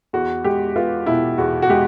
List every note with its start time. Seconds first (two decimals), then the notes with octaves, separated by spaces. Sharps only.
0.13 E2 F#4
0.44 G#3 G4
0.76 B3 F4
1.06 B2 E4
1.38 E2 F#4
1.62 F#4
1.70 G#3 G4